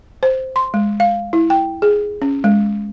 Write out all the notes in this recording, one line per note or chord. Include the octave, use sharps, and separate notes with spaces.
C5
C6
G#3
F5
E4
G5
G#4
C#4
G#3